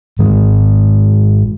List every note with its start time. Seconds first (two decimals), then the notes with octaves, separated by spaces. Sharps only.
0.19 G#2 D#3